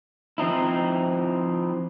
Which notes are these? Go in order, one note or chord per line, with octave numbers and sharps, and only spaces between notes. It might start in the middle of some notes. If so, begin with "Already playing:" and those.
F3 C4 D#4 E4